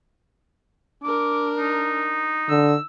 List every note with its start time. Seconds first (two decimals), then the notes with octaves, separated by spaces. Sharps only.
1.03 D4 A#4 D6
1.57 D#4
2.50 D3 E6